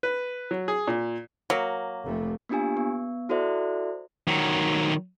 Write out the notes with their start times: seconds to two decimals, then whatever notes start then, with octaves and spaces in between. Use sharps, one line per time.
0.03 B4
0.51 F#3
0.68 G#4
0.88 A#2
1.50 F#3 A#3
2.03 F1 C3 A3
2.49 A#3 B3 D4 F4 G4 G#5
2.77 B3
3.29 E4 F#4 A4 C5 D5 E5
4.28 D#3 F#3